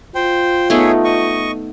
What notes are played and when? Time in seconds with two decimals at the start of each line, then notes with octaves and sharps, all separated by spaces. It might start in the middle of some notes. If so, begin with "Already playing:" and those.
0.15 F4 C5 G5
0.70 A3 B3 D#4 G#4 C#5 E5
1.04 D#5 C#6